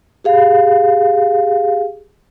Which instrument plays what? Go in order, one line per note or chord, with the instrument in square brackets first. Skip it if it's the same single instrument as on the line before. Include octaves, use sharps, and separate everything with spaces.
[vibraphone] G4 G#4 F5